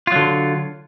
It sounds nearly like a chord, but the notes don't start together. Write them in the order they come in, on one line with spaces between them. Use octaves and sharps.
F4 F#3 D3